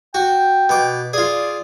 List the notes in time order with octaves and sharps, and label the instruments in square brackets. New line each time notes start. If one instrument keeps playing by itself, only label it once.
[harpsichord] F#4 [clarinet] G5
[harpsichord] B2 D6
[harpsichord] F4 G#4 [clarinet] D5